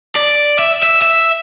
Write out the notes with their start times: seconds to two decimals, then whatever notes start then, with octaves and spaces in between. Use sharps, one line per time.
0.16 D5
0.59 E5
0.83 E5
1.02 E5